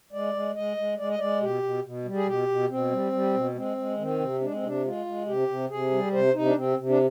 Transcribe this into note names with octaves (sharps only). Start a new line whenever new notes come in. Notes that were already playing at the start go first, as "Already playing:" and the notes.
G#3 D5
G#3
G#3 D#5
G#3
G#3 D5
D#5
G#3 D5
B2 G4
B2
B2
G3
G#4
B2 G4
B2
B2 C4
G3
G3
B2
G#3 C4
G#3
D#3 C4
C3
G#3 D4
C4
C3 D4
G#3 F4
G#3
C3 G4
C3
C3 G#4
G3
C3 C5
C3 D#4
D4
C3 C4
C3
D4